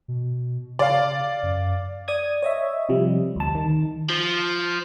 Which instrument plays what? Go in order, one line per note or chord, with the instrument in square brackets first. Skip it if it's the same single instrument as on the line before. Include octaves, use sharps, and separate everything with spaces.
[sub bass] B2
[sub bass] C#3 [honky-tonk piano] D5 F5
[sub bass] F#2
[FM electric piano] D5 D#6 G#6
C#5 D#5 E5
C3 F3 G3
D2 A5
D#3
[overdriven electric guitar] F3